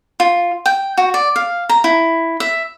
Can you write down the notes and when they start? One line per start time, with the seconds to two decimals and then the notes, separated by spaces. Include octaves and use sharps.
0.20 F4
0.66 G5
0.97 F#4
1.14 D5
1.36 F5
1.69 A#5
1.84 E4
2.40 E5